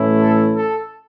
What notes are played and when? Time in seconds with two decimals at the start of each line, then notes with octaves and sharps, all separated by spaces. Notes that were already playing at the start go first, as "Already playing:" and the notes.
Already playing: A2 E3 A3 C#4 E4
0.22 A4
0.57 A4